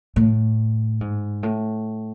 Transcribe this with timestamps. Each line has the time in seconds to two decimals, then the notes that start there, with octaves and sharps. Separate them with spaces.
0.16 A2
1.01 G#2
1.43 A2